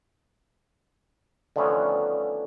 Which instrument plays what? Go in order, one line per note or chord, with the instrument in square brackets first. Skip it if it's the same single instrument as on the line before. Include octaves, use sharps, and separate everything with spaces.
[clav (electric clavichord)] D3 D#3 F3 A3 B3 C#4